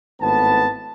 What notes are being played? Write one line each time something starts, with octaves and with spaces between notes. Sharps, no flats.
G#1 A2 B3 A5